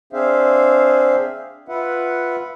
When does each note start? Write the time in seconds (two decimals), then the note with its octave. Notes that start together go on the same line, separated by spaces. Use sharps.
0.13 C4 D4 G#4 C5 E5 F5
1.68 F4 B4 E5 F#5